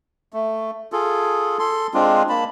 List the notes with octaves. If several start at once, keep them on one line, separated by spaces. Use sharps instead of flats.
A3
F4 G#4 A4
A4 C6
G#3 C4 D4 F4
A#3 A5 B5